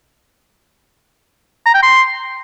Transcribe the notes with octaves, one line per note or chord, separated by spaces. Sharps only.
A#5
G5
C6